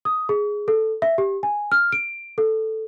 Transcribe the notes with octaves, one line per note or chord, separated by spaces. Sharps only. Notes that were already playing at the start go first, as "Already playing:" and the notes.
D#6
G#4
A4
E5
G4
G#5
F6
D7
A4